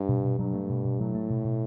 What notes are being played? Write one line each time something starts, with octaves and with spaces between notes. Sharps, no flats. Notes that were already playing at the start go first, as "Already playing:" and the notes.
Already playing: G2
B2
B2
G2 F#3
A3
B2
B2
A2 F#3
A3
B2
B2